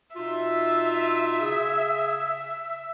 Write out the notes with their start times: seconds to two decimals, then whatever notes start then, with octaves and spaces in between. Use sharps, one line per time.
0.16 B2 D#4 F4 E5
1.41 C#3 G#4